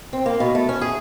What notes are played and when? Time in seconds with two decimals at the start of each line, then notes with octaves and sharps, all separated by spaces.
0.13 C4
0.26 A#3
0.40 B2
0.55 A3
0.69 C#4
0.81 G#4